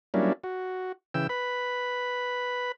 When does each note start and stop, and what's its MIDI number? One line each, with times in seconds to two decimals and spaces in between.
0.14 0.33 54
0.14 0.33 55
0.14 0.33 58
0.14 0.33 61
0.14 0.33 62
0.14 0.33 64
0.44 0.92 66
1.14 1.27 49
1.14 1.27 52
1.14 1.27 79
1.14 1.27 88
1.29 2.72 71
1.29 2.72 83